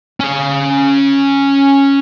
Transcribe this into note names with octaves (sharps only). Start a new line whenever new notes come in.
C#4 F5